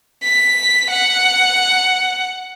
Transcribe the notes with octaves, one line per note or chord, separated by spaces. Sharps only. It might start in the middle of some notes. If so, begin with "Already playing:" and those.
B6
F#5